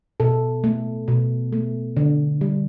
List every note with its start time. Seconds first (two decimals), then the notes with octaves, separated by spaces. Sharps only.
0.20 B2 A4
0.64 A3
1.08 B2
1.53 A3
1.97 D3
2.41 G3